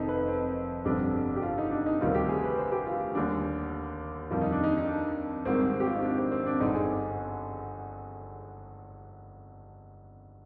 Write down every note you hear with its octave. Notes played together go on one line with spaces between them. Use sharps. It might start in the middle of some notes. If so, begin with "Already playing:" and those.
Already playing: F1 F2 D#3 C4 D#4
B4
C4
G1 F2 C3 G3 D4
G4
F4
D#4
D4
D#4
D2 C3 D#3 G3 F4
G4
G#4
B4
C5
G4
F4
D#2 D3 G3 D4
F2 D#3 G3 F4
D#4
D4
D#4
D#4
D4
G#1 G#2 D#3 G3 C4
G4
F4
D#4
D4
C4
C4
D4
G1 G2 D3 D#4
G#4